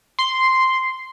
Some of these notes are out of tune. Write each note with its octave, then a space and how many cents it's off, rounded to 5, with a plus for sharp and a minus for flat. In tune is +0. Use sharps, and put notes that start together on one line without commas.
C6 -5